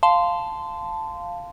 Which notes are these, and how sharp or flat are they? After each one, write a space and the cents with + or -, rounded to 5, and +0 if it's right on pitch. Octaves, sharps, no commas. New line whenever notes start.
F5 +0 A5 +0 C6 -20